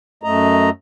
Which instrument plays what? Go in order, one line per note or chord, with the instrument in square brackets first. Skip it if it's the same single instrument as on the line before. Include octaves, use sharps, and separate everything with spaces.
[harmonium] F#2 A3 D#5 A#5